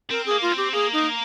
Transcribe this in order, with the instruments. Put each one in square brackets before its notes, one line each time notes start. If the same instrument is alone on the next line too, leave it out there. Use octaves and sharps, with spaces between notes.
[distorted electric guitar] C4 [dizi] A#4
[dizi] G#4
[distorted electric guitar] A#3
[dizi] F4
[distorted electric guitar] C4
[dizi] G4
[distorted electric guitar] A#3 [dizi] G#4
[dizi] D#4